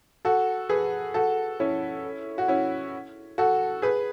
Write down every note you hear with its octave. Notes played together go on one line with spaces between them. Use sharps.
F#4 A4
G#4 B4
F#4 A4
C#4 E4
F#4
C#4 E4
F#4 A4
G#4 B4